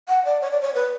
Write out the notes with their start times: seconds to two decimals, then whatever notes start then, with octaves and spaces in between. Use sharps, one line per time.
0.09 F#5
0.25 D5
0.41 C#5
0.51 D5
0.61 C#5
0.75 B4